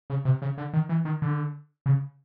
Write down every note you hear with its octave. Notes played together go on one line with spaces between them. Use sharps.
C#3
C3
C#3
D3
D#3
E3
D#3
D3
C#3